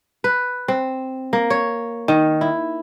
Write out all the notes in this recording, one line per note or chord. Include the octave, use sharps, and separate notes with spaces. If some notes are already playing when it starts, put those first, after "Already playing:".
B4
C4
A#3
C#5
D#3
E4